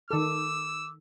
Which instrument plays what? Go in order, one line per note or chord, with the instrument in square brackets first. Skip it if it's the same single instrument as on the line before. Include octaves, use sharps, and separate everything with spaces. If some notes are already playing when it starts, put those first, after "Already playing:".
[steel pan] D#3 A4 [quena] D6 [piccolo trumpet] E6